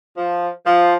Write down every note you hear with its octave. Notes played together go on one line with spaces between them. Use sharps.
F3
F3